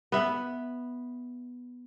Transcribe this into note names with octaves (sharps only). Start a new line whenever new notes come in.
B3 E5